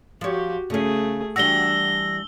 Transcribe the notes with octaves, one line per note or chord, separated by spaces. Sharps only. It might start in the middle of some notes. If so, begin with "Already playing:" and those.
F3 F#4 G4 C#5
C#3 A3 C#4 G#4
E3 G3 D4 F#4 E6 A#6 G7